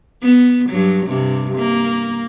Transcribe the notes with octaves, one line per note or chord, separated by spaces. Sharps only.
B3
G2 F#3
G2 C3
A#3